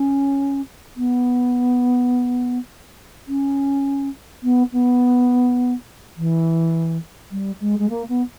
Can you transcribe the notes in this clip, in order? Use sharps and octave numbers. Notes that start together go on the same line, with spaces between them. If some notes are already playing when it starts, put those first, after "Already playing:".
Already playing: C#4
B3
C#4
B3
B3
E3
G3
G#3
G#3
A#3
B3